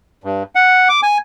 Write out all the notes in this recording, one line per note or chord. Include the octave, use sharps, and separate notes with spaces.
G2
F#5
D6
G#5